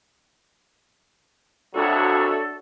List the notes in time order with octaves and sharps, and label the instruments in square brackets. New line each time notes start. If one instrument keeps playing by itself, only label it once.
[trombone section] C2 F2 F#3 [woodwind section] D4 A4 [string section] F#4 C#5 E5